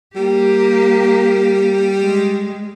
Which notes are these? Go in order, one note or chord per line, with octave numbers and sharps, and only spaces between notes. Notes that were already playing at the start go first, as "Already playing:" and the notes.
G3 A#3 G4
G#3